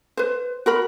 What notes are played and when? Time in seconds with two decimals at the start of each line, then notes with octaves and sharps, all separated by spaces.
0.17 B4 C5
0.66 F#4 A#4 B5